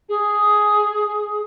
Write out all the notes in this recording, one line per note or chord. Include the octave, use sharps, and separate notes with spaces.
G#4